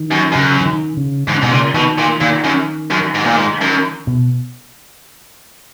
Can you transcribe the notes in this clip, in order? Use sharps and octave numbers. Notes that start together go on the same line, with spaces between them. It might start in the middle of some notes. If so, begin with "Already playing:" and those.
Already playing: D#3
F#2
F#2 C#3
E3
D#3
C#3
G#2 D#3
C#3
G#2 B2
A#2 C#3
B2 D#3
A#2
A#2 D#3
F#2
F#2
G#2
A#2
G#2
F#2
B2